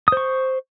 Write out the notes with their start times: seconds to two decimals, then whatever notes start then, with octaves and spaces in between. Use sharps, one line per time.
0.08 D#6
0.12 C5
0.17 C#6